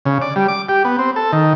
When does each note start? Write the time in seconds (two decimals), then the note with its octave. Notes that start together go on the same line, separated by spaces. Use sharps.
0.06 C#3
0.22 D5
0.36 G3
0.48 D6
0.69 G4
0.85 B3
0.99 C4
1.16 A4
1.32 D#3